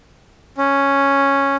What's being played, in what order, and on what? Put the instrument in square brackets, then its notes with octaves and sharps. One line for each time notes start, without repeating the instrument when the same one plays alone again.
[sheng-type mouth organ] C#4